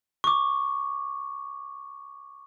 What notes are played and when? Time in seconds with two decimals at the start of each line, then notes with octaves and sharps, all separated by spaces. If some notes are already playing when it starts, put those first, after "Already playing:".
0.24 C#6 D6